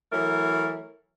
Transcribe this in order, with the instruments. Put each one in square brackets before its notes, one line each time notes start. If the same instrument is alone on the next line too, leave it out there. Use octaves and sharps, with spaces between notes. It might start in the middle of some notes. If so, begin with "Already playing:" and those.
[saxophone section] E3 F#3 A3 E4 A#4